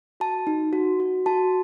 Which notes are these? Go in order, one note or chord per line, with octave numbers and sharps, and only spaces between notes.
F#4 A5
D#4
F#4
F#4
F#4 A5